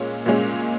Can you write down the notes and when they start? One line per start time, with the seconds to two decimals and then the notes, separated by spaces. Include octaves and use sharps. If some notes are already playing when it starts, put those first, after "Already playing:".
Already playing: A#2 G#3 C#4
0.26 A#2 G#3 C#4